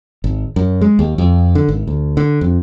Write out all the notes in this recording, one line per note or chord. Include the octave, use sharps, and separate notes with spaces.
G#1
F#2
G#3
D#2
F2
D3
G#1
D2
D3
F2